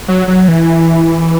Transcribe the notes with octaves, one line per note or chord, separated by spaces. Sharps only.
F#3
F#3
E3